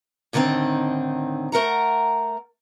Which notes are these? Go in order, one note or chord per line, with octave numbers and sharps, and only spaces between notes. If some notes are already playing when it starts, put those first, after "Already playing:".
A2 D3 D#3 G#3 C4 D#4
A3 A#4 F#5 A#5